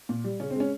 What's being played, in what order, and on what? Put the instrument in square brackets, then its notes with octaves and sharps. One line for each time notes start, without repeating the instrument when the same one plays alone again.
[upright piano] A#2
G3
C#3 C#4
C4
G#3 C#4